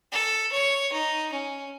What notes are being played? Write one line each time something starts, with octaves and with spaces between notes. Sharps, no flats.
A4
C#5
D#4
C#4